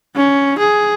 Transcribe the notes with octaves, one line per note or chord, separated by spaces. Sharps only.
C#4
G#4